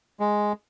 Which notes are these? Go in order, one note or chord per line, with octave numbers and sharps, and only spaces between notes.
G#3